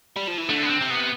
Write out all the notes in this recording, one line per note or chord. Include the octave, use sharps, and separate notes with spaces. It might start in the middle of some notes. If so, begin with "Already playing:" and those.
G3
F3
E3
D3 A3
B3
C4
C3
B3